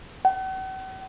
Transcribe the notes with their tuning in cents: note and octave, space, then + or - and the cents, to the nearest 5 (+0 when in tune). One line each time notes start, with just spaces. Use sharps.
F#5 +45